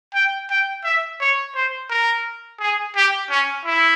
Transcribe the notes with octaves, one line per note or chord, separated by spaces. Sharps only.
G5
G5
E5
C#5
C5
A#4
G#4
G4
C#4
E4